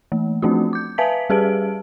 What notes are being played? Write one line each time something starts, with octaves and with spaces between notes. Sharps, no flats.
E3 A3
F3 A3 C4 D4 F4 F#4
D6 G6
B4 E5 F5 G#5 A5 B6
G3 G4 G#4 B4 A5 D7